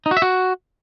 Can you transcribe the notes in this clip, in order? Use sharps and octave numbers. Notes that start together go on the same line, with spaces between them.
D#4
F#4
E5
F#4